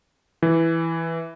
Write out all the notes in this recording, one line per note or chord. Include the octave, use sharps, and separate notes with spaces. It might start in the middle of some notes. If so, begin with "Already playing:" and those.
E3